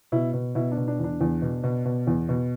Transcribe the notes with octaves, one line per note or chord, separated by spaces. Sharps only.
B2 E4
B2
B2 E4
D4
B2
D4
E2
D4
E2
B2
B2
B2
E2
B2